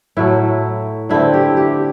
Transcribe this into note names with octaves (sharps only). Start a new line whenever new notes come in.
A2 F#3 A3 E4
D3 A3 C4 E4
G4
G4